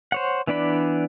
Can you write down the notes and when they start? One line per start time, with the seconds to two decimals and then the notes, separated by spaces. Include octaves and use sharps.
0.12 C5 C#5 F#5
0.47 E3 B3 D4 D5 B5